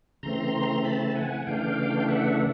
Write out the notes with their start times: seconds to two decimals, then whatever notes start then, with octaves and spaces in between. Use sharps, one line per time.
0.23 C#3 E3 A3 C4 A#5 C6
0.84 A5 B5
1.15 F#5 G#5
1.47 C#3 E3 A3 D4 F5 G5
1.99 G5
2.08 E5 F#5